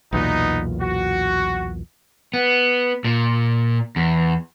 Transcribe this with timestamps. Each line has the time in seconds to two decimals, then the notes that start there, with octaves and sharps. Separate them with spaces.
0.13 B1 E2 A#2 B3 D#4
0.80 F#4
2.34 B3
3.04 A#2
3.96 E2